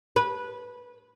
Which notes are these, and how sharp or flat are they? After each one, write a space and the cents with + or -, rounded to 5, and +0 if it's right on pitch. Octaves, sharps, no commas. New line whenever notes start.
B4 -15